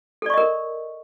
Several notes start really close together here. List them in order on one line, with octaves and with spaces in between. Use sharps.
A4 D5 C#6 D#5 A#4